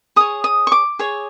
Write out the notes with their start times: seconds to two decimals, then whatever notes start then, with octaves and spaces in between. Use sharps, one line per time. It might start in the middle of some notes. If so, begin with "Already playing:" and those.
0.16 G#4 C#5 D#6
0.44 D#6
0.67 C#6
0.72 D6
0.99 G#4 C#5